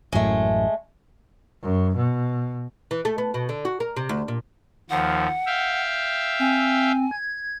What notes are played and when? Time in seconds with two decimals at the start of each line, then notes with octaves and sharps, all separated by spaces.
0.12 A1 F#2 A2 G#3 A3
1.63 F#2
1.97 B2
2.91 E3
3.05 A3
3.18 B3
3.34 B2
3.49 D3
3.65 F#4
3.80 A#4
3.96 C3
4.09 D2
4.28 A#2
4.90 D#2 F3 F#5
5.46 E5 F5 G5
6.39 C4 G#5
7.11 G#6